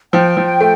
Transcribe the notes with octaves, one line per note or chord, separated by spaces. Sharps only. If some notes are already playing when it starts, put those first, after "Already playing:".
F3 G5
F3
A3